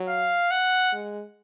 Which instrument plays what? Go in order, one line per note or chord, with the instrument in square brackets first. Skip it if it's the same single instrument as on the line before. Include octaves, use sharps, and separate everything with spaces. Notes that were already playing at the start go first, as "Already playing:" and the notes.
Already playing: [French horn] F#3
[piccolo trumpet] F5
F#5
[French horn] G#3